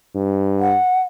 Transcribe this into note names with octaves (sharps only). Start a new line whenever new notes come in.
G2
F#5